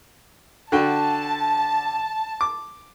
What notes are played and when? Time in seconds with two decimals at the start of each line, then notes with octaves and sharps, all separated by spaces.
0.72 D3 F#4 G5 A5
2.41 D6